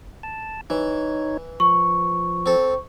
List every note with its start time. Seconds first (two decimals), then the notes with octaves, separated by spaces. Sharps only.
0.23 A5
0.70 E3 D#4 C#5
1.60 F3 C#6
2.46 C4 A4